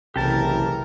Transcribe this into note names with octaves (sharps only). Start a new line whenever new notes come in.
F#1 B1 C3 E3 G4 A4 A#4 A5